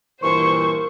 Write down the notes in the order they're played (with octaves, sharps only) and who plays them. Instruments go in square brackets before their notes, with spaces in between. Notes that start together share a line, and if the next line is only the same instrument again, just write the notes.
[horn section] G2 A#2 E3 [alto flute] A#4 [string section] C5 [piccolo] C#6